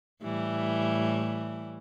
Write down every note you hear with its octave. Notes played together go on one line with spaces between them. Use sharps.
A2 E3 G3